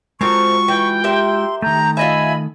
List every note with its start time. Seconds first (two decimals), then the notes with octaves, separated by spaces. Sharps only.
0.21 G#3 A3 C4 F4 F#4 A#4 C#6
0.68 E3 G5
1.04 G4 A#4 E5 C6
1.62 D#3 A3 A#5 G6
1.97 F4 D#5 E5 G#5 B5